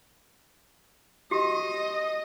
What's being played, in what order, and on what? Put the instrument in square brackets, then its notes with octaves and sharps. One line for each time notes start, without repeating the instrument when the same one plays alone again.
[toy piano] F#4 G4 [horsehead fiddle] D#5